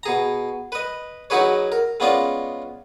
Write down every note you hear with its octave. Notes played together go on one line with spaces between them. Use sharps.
B2 G#4 A#5
B4 D#5
F#3 D#4 F#4 G#4 B4 C#5
A#4
G#3 B3 C#4 F4 D5 D#5